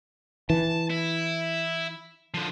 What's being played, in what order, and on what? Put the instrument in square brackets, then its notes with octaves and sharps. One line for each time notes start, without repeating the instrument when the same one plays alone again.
[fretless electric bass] E3 [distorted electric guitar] A5
[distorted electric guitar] E4
D3 F3